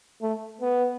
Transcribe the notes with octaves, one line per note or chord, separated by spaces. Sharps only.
A3
B3